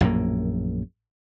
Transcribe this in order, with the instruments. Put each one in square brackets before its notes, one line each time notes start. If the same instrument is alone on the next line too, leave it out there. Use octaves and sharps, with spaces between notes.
[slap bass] A#1 F#2 A2 A#3